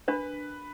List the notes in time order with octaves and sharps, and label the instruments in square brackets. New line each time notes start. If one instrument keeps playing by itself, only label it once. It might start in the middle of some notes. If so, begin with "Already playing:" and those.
[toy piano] D4 [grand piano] B4